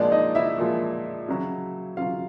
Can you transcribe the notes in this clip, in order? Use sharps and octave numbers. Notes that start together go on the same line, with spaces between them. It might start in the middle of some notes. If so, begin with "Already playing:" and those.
Already playing: A#2 F3 G#3 D4 D5
D#4 D#5
E4 E5
A#2 F3 G#3
C#3 F#3
C#3 F#3 F4 F5